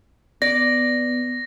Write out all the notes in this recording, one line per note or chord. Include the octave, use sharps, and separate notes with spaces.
B3 D5 A#6